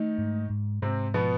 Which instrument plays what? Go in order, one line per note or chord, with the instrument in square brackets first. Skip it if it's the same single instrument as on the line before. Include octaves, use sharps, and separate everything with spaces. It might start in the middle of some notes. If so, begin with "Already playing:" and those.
Already playing: [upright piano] D#3 D#4 [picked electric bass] A3
[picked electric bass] G#2
G#2
[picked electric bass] G#2 [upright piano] C3 C4
[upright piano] B2 B3 [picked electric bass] F3